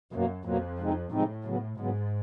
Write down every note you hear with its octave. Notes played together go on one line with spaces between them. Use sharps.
F#2 B2 F#3 A#3
F2 B2 F#3 A#3
C3 F3 G#3 C4 D#4
A2 C3 F3 G#3 C4 D#4
C#3 F#3 B3
G#2 C#3 F#3 B3